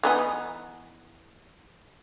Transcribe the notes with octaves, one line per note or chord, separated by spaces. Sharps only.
E3 B3 D#4